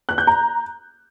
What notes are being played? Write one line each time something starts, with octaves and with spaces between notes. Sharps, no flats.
F#6
G6
A#5